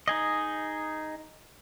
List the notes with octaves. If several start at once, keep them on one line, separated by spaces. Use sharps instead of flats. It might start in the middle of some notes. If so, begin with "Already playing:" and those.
D#4 G#4 D#5